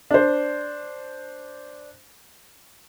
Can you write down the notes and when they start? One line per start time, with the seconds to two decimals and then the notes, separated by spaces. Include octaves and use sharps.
0.11 D4 C5